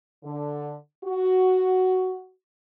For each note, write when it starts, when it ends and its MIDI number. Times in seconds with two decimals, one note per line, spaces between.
0.24 0.74 50
1.05 2.28 66